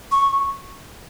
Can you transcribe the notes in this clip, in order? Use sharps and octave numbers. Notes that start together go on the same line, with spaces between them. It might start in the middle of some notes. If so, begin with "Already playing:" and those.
C#6